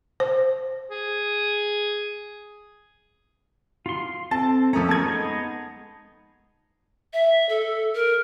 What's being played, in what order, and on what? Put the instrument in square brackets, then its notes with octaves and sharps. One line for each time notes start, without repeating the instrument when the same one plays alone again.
[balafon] C5
[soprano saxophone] G#4
[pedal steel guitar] F4 C6
[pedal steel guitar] C4 A4 [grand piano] A5 A6
[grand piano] F2 A3 A#5 [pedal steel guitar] C#4
[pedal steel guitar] A#3 G#4 C#6 [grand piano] A5 G#6
[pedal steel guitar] G#3 B3 D#4
[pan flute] E5
A4
A#4